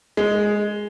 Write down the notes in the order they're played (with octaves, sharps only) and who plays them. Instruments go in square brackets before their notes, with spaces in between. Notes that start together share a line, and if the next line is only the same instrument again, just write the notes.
[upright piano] G#3